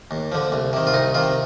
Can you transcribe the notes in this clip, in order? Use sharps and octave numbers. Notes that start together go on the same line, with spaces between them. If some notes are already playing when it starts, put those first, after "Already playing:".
D#2
D3 F3
C2
C3 D#3
F4
C2 D#4
C3 D#3 F4